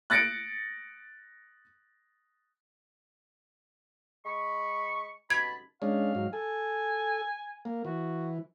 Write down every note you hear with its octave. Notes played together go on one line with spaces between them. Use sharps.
F#6 A6 A#6 C#7 D7
G#3 B5 C#6
B2 A5 B5 G#6
G#3 C#4 D4 F5
G#2 F#3
A4 G#5
A#3
E3 F#4